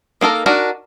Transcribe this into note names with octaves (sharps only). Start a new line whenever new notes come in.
A#3 D#4 A4 A#4
D4 D#4 F#4 A#4